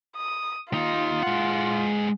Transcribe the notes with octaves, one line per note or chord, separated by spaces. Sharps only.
D#6
D#2 D#4 F4
G#3 F#5